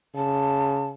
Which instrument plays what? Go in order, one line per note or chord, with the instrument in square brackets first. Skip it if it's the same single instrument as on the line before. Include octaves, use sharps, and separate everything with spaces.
[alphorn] C#3 [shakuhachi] A5